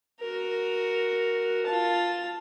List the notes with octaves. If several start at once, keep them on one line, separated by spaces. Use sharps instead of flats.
F#4 A#4
F4 A5